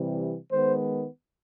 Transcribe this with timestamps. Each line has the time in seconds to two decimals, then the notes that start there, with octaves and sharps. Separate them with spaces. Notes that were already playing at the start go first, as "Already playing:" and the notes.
Already playing: C3 E3 G3
0.52 D#3 G#3 B3 C5